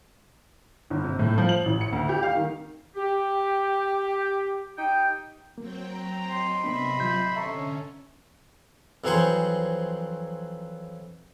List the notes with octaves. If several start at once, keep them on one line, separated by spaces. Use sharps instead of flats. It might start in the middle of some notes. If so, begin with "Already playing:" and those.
G1
C3
A2
F3
F#7
A1
C#7
D2
G4
F5
D#3
G4
D#4 G4 G5
F#3 A#3 C4 G5
A#5
D#5 C6
C3 A#3 B3 D4 E5 B5
F#3 F4 G6
D3 C#4 A4 E5 A#5 C#6
F2 E3 F#3 G#4 C5 C#6